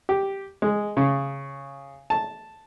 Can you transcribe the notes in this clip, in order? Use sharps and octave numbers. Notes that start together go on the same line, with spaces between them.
G4
G#3
C#3
A5